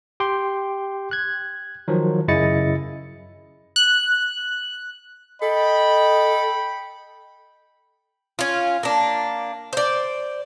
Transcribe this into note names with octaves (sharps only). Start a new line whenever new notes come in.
G4 G5 C6
F#6 G#6
D#3 F3 F#3
F#2 C#3 E4 D#5 A6 C#7
F#6
A4 D#5 G5 B5
C#4 F4
A#3 D4
C5 D5